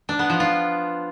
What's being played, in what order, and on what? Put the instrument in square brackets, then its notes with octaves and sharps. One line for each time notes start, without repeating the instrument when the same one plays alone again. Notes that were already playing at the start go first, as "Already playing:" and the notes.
[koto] D4
B3
F3
F4